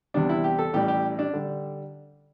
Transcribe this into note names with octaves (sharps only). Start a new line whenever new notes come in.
E2 C3 G3 D4
E4
G4
A4
A1 A2 G3 G4
G4
D4
D3 G3